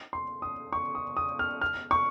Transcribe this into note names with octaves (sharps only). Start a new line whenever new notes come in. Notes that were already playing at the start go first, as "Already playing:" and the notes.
C6
D#6
C#6
D#6
D#6
F6
F6
C#6